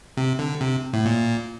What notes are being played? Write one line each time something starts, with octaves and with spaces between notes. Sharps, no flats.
C3
D3
C3
A2
A#2